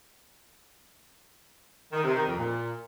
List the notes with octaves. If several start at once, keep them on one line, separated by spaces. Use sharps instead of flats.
D#3
C3
D#3
F2
A#2